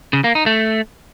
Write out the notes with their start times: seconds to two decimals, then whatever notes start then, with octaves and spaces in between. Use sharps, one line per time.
0.13 C#3
0.24 A#3
0.35 D#4
0.46 A3